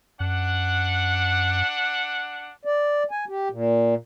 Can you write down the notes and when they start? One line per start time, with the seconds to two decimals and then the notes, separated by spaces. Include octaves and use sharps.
0.20 F#2 D4 F#5
2.65 D5
3.11 G#5
3.29 G4
3.50 A#2